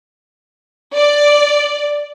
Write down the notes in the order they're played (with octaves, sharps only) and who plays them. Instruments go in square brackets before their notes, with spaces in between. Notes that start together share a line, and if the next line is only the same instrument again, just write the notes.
[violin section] D5